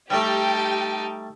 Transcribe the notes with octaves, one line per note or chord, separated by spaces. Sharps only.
G3 A3 D#4 G4 G5 A5